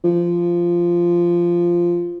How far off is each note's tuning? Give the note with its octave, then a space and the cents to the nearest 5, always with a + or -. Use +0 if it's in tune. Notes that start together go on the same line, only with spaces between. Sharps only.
F3 -10